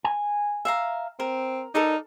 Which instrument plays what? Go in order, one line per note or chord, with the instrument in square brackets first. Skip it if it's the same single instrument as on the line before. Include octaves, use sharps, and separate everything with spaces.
[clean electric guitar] G#5
[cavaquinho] E5 F5 A#5
[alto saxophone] C4 [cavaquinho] A#4
[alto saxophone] D#4 [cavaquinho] A4 A#4 D5